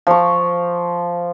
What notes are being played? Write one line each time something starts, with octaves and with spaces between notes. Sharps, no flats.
F3 C#6